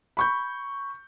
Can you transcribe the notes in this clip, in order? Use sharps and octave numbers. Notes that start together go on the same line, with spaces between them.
B5 C#6 G6